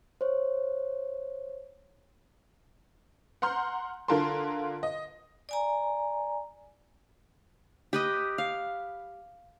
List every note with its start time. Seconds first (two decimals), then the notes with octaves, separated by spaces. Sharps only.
0.21 C5 C#5
3.42 F#5 A#5 C6 F6 G6
4.08 D3 F4 A#4 A5 C6
4.83 D#5
5.49 D5 G#5 A#5
7.93 G4 B4 D#5
8.38 F5